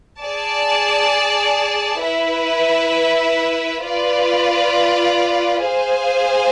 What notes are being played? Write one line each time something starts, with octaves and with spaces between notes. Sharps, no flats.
G#4 D5 A5
E4 B4 E5
F4 B4 D5
G#4 C5 F5 G#5